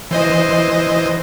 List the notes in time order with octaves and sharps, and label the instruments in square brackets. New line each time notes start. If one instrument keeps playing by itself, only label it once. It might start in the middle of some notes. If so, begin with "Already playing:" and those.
[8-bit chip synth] E3 C5 D#5